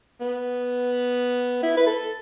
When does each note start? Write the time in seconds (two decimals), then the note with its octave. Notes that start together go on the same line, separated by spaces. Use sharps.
0.21 B3
1.63 E4
1.77 B4
1.87 A4